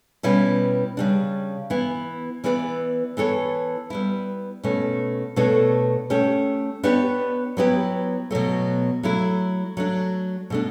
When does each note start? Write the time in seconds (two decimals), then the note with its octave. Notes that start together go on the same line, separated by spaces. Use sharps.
0.23 B2 G3 C#4 E4 B4
0.97 C#3 G3 D4
1.70 E3 B3 E4
2.44 E3 B3 E4 B4 D5
3.17 E3 B3 E4 A4 C#5
3.90 G3 B3 E4
4.64 B2 A3 C#4
5.36 B2 A3 D4 A4 C#5
6.10 A3 C#4 G4
6.83 B3 D4 G4 C#5
7.57 F#3 B3 E4 G4
8.31 B2 F#3 A3
9.03 F#3 A3 E4
9.77 F#3 A3 D4
10.50 B2 A3 D4